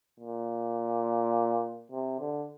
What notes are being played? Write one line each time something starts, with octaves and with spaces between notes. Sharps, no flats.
A#2
C3
D3